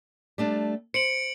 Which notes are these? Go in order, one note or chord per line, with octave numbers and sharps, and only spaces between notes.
G3 A3 D4
C5 C#7 D7 F#7